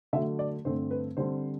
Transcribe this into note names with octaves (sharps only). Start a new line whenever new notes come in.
D3 F#3 A3 E5
D5
G2 D3 A3 C4 C5
B4
D3 G3 C4 C5